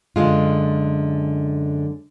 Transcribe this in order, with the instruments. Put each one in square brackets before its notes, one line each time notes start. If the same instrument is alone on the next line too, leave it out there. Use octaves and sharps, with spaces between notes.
[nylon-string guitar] F#2 D3 G#3 F4